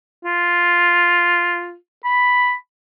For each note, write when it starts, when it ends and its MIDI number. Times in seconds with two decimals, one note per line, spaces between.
0.25 1.75 65
2.04 2.53 83